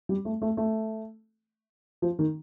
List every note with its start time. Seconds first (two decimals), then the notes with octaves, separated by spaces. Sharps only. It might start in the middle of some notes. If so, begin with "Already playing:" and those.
0.09 G3
0.25 A3
0.42 A3
0.57 A3
2.02 F3
2.19 D#3